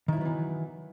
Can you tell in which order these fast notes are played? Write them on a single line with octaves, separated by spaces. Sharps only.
D#3 E4 F#3 B3 E3